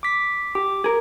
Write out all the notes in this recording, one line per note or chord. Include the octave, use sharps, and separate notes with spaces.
D6 B6
G4 D6
G#4 A#4